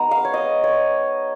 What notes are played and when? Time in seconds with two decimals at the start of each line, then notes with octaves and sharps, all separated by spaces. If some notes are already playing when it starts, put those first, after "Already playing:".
Already playing: G#3 B3 D#4 A#5
0.11 F5
0.25 C#5
0.34 D#5
0.64 C#5